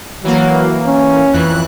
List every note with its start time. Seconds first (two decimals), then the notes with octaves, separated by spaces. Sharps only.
0.24 E3 F#3 A#3
0.87 C#4
1.33 F2 E3 F#6